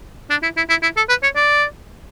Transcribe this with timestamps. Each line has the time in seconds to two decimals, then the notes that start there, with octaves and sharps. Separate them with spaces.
0.30 D4
0.43 E4
0.57 E4
0.69 E4
0.82 E4
0.97 A4
1.09 B4
1.23 C#5
1.35 D5